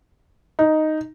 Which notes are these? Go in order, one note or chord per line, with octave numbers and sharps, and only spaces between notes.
D#4